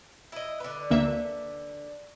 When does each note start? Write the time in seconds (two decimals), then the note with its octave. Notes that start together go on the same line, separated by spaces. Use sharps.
0.32 E4 D#5
0.60 D3 B4
0.90 D2 A#3 E5